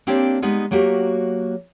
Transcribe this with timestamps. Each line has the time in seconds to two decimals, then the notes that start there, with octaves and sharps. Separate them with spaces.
0.07 A#3 C4 D4 G4 C#5 D5
0.42 G3 G#3 B3 D#4
0.71 F#3 A#3 F#4 G4